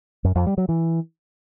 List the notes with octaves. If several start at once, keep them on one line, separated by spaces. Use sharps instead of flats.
F#2
F2
G3
F#3
E3